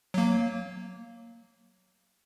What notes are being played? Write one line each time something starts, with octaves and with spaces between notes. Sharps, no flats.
F#3 A#3